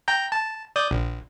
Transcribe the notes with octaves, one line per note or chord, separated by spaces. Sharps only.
G5 A#5 G6
A5
D5 D#6 G6
A#1